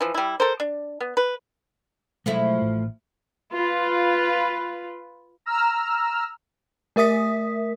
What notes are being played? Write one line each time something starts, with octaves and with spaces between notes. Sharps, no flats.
E3 F3
G3 E4
A4 A#4 C5
D4
B3
B4
B2 F3 F#3 G#3 A3 E4
A1 A2
F4 B4
A#5 E6 F6
A3 A#4 E5 D#6 B6